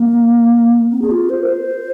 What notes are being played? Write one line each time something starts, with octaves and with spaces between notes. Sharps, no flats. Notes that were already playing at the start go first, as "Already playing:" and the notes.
Already playing: A#3
C4
G#4
F4
C5
A#4
C5